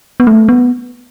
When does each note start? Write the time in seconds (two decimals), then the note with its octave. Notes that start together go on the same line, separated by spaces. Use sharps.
0.20 B3
0.27 A3
0.49 B3